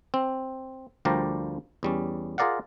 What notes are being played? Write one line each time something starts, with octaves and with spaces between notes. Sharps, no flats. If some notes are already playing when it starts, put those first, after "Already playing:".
C4
D2 F3 G3 G4 A#4 D5
E2 G3 C#4
F4 G#4 A#4 D5 F5 F#5